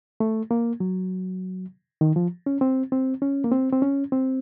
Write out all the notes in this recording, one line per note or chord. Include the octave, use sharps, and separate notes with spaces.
A3
A#3
F#3
D#3
F3
C#4
C4
C4
C#4
A#3
C4
C4
C#4
C4